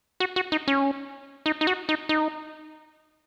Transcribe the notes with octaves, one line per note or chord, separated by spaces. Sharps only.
F#4
F#4
D#4
C#4
D#4
D#4
F#4
D#4
D#4